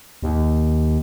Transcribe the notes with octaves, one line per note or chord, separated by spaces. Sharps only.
D#2